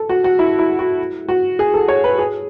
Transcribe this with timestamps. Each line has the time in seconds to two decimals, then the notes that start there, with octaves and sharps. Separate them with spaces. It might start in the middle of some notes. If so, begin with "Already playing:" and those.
Already playing: A4
0.09 F#4
0.24 F#4
0.39 E4
0.59 E4
0.79 F#4
1.29 F#4
1.59 G#4
1.74 A4
1.88 C#5
2.04 B4
2.19 G#4